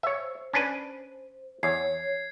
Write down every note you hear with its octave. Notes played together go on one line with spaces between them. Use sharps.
C5 C#5 E5
C#4 D4 B4
E2 C#5 G#6 C7